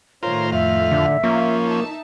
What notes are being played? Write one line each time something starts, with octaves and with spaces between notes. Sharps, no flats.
A2 D#3 F4 A#4 C5 C#5
F2 E5 F5
D3
F3 A#3 C#4
D#4 E5 A5